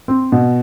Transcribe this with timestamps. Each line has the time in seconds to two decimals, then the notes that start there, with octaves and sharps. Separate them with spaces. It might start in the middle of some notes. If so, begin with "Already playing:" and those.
0.08 C4
0.32 B2